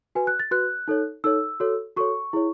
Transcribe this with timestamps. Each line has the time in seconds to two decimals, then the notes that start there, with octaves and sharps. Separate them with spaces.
0.15 F#4 B4 G#5
0.27 F#6
0.40 A6
0.51 F#4 B4 F#6
0.88 D#4 A4 C#5
1.24 D#4 A4 C#5 E6
1.60 F#4 A4 C#5
1.97 F#4 A4 C#5 C#6
2.33 E4 G#4 C#5